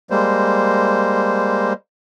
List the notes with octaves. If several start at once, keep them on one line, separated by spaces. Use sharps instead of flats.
G3 G#3 A#3 C5